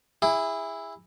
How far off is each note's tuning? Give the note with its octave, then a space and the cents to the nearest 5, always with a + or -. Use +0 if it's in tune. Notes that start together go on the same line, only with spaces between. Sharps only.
E4 +0 G#4 -30